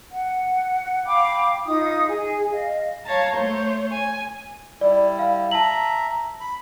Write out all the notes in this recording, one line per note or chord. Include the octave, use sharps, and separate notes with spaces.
F#5
F5 G5 B5 D6
D#4 F4 D#6
G#4 G#5
D#5 F5
C#5 F5 A5 A#5
A3 C5 C#5
G#5
G3 E4 D5
F5
E5 A5 A#5 F#7
B5